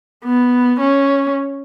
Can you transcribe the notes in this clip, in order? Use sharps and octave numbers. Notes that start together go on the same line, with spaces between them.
B3
C#4